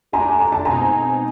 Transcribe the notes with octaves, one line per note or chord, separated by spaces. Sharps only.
A3 D4 G4 G#5 A#5
A#5
A5
B2 G#3 C4 D#4 G#5 A#5